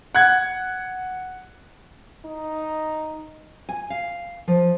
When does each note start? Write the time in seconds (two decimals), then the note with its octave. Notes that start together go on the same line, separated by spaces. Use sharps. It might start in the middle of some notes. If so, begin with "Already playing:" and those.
0.15 F#5 F#6 G#6
2.25 D#4
3.69 G#5
3.90 F5
4.48 F3